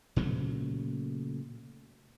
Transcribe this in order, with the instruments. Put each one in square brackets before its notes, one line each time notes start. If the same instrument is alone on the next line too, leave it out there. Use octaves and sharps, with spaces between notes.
[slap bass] A#2 C#3 F#3 A3